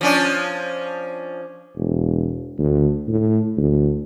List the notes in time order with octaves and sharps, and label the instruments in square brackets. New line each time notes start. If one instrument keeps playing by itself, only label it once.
[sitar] F3 C#4 D4
[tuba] E1
D2
A2
D2